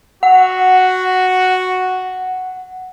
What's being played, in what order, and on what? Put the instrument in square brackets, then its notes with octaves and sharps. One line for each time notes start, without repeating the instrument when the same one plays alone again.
[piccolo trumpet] F#4 [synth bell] F#5